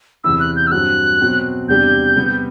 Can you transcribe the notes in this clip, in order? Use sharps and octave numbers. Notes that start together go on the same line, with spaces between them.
E2 C3 E3 B3 E4 E6
F#6
G6
E6
G2 F#3 C4 F#4 F#6
B2 F#3 C4
E2 C3 G3 D4 G4 G6
C3 G3 B3